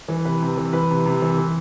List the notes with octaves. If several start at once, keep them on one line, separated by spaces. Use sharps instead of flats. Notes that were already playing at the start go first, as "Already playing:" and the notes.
E3
C3 B4
C3
E3
E3 B4
C3
C3
E3
E3